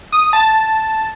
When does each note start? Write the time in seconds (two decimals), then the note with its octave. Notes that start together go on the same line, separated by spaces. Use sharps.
0.12 D#6
0.33 A5